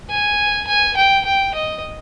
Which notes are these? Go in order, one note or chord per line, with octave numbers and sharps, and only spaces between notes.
G#5
G#5
G5
G5
D#5